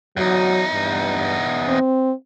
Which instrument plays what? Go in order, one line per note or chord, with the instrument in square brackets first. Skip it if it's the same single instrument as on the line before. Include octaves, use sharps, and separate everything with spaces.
[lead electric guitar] E2 D#4 [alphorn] F#3
[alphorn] G2
C4